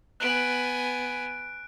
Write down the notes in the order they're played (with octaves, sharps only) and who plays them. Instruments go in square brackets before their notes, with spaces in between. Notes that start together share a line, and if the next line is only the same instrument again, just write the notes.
[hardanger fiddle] B3 G#5 [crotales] F#6 D7